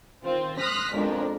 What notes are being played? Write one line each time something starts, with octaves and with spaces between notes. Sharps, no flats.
D#3 C4 F4
C6 D#6 F6 F#6 A#6 B6
B1 F2 G#3 D4 A#4